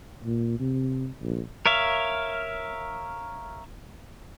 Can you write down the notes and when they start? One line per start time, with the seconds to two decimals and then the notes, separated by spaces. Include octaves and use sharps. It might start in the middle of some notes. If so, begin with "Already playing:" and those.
0.24 A#2
0.59 C3
1.22 A#1
1.66 A#4 C#5 E5 F5